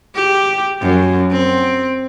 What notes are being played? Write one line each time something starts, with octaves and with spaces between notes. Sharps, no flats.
G4
F#2
C4